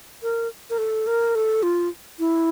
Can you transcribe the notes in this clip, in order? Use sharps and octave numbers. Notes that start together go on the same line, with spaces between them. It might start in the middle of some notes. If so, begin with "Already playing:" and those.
A#4
A#4
A4
A#4
A4
F4
E4